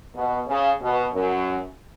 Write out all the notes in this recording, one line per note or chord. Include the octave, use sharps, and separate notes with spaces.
B2
C#3
B2
F#2